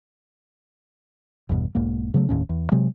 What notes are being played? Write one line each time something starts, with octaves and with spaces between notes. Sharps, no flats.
G1 E2 G2 B2
E1 B1 G#2 A#3
C#3 F#3 G3 A3
F1 D#2 A2 C#4
E2
C3 F#3 G#3